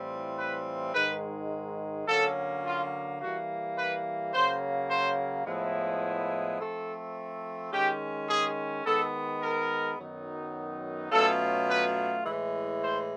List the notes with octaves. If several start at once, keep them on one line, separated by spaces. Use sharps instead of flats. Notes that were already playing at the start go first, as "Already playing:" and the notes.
Already playing: A2 E3 G3 C4 F4
B4
G#2 D#3 G#3 B4
D3 F#3 A#3 C#4 A4
F4
E3 G3 A#3 F#4
B4
C#3 F#3 A#3 C5
C5
A2 F3 G#3 B3 E4
F3 A3 C4 A4
D#3 G#3 C#4 G4
G#4
D#3 G#3 B3 A4
A#4
F#2 D#3 F#3 B3 D#4
B2 F#3 A3 C#4 F4 A4
B4
A2 E3 G#3
C5